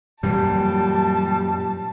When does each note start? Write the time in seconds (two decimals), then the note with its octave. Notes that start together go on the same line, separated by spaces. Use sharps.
0.23 F#2 A#2 E3 G3 A5